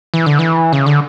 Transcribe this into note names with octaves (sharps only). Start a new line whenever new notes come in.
E3
D3
E3
C#3
D3